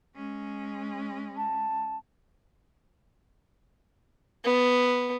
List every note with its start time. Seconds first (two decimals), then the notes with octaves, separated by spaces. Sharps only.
0.15 G#3 C#4
1.37 A5
4.44 B3